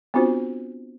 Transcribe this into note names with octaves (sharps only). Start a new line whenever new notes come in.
B3 C4 D4 F4 F#4 C5